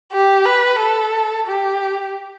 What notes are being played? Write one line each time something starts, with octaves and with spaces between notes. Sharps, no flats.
G4
B4
A4
G4